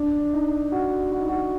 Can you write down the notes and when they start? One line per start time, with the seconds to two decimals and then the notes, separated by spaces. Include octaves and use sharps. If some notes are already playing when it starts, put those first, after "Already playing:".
Already playing: D4
0.33 D#4
0.72 F#4
1.12 F#4
1.20 D#4
1.29 F#4